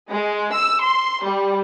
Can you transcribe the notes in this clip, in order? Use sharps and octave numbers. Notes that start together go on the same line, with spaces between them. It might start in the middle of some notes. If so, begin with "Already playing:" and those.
G#3
E6
C6
G3